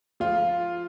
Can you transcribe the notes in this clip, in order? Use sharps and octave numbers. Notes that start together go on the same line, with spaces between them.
F3 F4